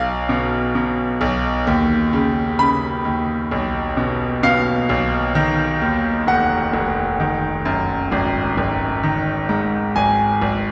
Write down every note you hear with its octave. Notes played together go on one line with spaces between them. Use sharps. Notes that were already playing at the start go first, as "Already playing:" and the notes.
Already playing: B1 F5
B2
B2
B1
D#2
C#3
C#3 B5
D#2
B1
B2
B2 F5
B1
D#3
D#2
F1 F#5
F1
D#3
F#2
G#1
G#1
D#3
G#2
G#1 G#5
G#1